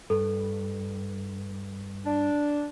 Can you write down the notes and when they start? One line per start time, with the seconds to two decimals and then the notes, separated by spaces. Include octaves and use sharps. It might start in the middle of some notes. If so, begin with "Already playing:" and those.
0.10 G2 A4
2.05 D4